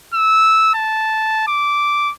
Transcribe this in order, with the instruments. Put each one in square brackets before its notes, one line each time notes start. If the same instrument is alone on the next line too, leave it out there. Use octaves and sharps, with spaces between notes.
[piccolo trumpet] E6
A5
D6